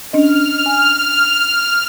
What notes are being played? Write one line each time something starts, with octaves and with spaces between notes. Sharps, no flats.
C#4 D4 D#5 F6
G#5